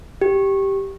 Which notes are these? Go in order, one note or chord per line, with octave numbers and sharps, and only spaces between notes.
G4